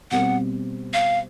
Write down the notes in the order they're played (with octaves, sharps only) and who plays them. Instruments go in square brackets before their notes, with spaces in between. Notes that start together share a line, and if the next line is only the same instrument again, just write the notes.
[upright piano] B2 G3 C4 [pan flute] F#5
[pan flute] F5